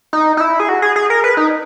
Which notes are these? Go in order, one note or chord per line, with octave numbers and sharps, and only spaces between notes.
D#4
D#4
E4
G#4
F#4
G#4
G#4
A#4
B4
D#4